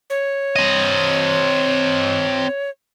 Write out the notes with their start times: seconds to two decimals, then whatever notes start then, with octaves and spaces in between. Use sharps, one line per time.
0.10 C#5
0.56 C4 D#5